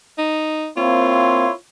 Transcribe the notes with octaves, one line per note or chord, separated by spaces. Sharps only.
D#4
A#3 C4 E4 F4 C#5 C6